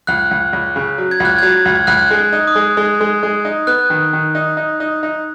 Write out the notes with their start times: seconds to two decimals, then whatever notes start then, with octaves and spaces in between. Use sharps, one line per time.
0.07 C#2 F#6
0.31 C#2
0.53 C#2
0.76 C#3
0.98 F#3
1.11 G#6
1.20 C#2
1.25 F#6
1.38 F#3 G#6
1.65 C#2
1.87 C#2 F#6
2.11 G#3
2.32 D#4
2.47 D#6
2.55 G#3
2.77 G#3
3.01 G#3
3.23 G#3
3.45 D#4
3.67 B3 F#6
3.90 D#3
4.13 D#3
4.35 D#4
4.57 D#4
4.80 D#4
5.03 D#4